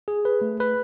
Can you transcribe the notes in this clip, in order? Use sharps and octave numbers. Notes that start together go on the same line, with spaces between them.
G#4
B4
A3
B4